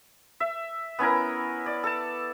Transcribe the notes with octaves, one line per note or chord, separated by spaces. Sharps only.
E5
B3 C#4 E4 A#4
D5
A4 A5